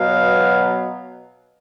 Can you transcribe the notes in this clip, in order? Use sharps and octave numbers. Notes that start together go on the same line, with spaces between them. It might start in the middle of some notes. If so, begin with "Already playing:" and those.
Already playing: B2 F#3 B3 F5